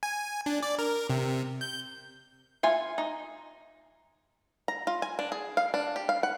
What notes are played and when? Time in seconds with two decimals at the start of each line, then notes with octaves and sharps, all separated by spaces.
0.03 G#5
0.46 D4
0.63 D5
0.79 A#4
1.10 C3
1.61 G6
2.63 F4 E5 G#5
2.98 D#4
4.68 A#5
4.87 F4
5.02 G#5
5.19 D4
5.32 G#4
5.57 F5
5.74 D4
5.96 G4
6.09 F5
6.23 F#5